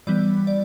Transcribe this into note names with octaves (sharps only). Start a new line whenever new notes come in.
E3 G3 B3 D5
D5